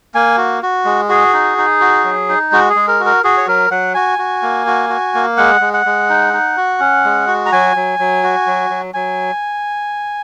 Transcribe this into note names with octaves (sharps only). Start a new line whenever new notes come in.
A#3 G#5
F#4
F#4
G#3
F#4 G#4
D#4
D#4
F#4
F#3
D#4
G#3 F#4
G#4
G#3
A#4
F#4
A#4
F#4 G#4
C#5
F#3 A#4
F#3 F#5
F#4 G#5
F#4
A#3
F#4
F#4
A#3
G#3 F#5
G#3
F#5
G#3
D#4
D#4
F#4
C#4
G#3
F#4
A#5
F#3 G#5
F#3
F#3
F#4
F#3
F#3
F#3 G#5